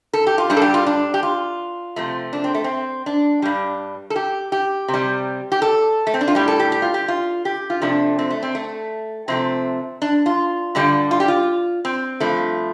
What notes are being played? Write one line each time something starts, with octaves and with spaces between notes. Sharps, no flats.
A4
G4
F4
G2 G3 D4
A4
G4
F4
D4
G4
F4
C3 F3 A3
D4
C4
A3
C4
D4
G2 G3
A4
G4
G4
C3
G3
G4
A4
A3
C4
D4
F4
A2 G3 G4
A4
G4
G4
F4
G4
F4
G4
F4
C3 F3 A3 D4
C4
A3
C4
A3
C3 F3 A3 C4
D4
F4
G2 D3 G3
F4
G4
F4
C4
G2 F3 A3